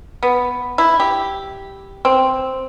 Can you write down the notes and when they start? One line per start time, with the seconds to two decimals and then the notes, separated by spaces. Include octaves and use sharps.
0.23 B3
0.78 E4
1.00 G4
2.05 C4